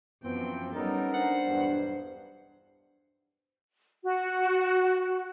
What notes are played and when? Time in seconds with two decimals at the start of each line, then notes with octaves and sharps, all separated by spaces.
0.23 F#2 E3 F3 B3 C4 G5
0.73 G3 B3 C#4 D#4 A4 A#4
1.14 D4 C5 F#5
1.45 B1 E2 G2
4.04 F#4